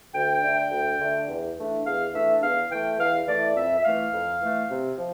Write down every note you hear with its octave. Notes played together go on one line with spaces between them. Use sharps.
D2 G5
D3 A3 D4
D2
D3 A3 D4
E2
E3 A3 D4
E2 F5
E3 A3 D4 E5
E2 F5
E3 A3 G5
E2 F5
E3 A3 D5
F2 E5
E5
E3 A3 F5
F2
E3 A3
C3
F3